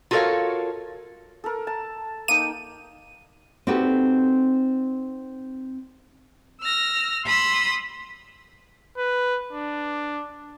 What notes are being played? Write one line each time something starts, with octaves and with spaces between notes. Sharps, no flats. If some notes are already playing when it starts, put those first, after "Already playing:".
F4 F#4 A4 A#4 C#5 F5
A4 A#4
A5
A#3 D#4 G5 D#7
C4 D#4 F#4 G4 A4 B4
E6 F6 A#6
B5 C6 D#6 E6
B4
D4